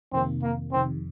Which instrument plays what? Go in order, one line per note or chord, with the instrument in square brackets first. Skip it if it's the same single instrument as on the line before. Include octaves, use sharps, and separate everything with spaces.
[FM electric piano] F2 C3 D#3 A#3 [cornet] C4
[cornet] A#3
[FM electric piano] F2 C3 D#3 [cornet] C4